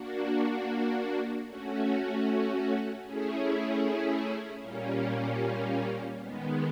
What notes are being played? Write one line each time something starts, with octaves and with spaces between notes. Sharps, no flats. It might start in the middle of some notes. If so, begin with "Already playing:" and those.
Already playing: A#3 D4 F#4
A3 C#4 F#4
A3 C#4 E4 G#4
A#2 G3 A#3 C#4
D#3 G#3 B3